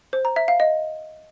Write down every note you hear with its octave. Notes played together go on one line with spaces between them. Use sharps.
C5
A#5
E5
F5
D#5